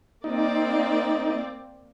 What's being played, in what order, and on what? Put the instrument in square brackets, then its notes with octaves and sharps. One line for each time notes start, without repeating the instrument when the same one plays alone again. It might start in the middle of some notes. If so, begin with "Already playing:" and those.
[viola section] A#3 C4 D5 [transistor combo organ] D#4